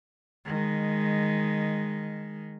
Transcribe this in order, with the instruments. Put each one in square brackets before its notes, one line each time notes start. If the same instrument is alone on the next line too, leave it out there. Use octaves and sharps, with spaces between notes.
[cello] D#3 G#3